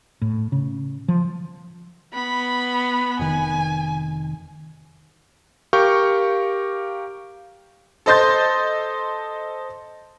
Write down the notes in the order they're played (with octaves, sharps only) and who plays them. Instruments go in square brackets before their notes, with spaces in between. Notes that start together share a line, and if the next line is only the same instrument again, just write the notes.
[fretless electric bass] A2
C#3
F3
[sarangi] B3 [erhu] B5
[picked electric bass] F1 D#3 [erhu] G#5
[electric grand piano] G4 A#4 F5 C#6 G6
[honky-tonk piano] A4 C5 D#5 C6 G6 A6